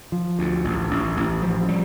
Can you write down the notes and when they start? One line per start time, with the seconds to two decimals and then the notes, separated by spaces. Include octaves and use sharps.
0.12 F3
0.39 D2
0.64 A1
0.91 A1
1.17 A1
1.42 F3
1.69 G3